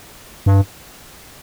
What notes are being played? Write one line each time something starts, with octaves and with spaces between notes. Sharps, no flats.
G2